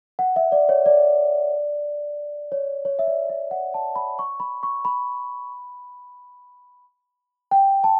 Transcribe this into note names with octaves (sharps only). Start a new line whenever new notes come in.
F#5
E5
D5
C#5
D5
C#5
C#5
E5
D5
E5
F#5
A5
B5
C#6
B5
C#6
B5
G5
A5